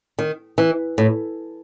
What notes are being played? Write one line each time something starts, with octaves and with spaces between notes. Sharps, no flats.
D#3
E3
A2